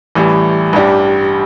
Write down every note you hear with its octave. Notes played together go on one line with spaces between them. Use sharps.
A1 A2 E3 G3
A1 G2 G3 D4 G4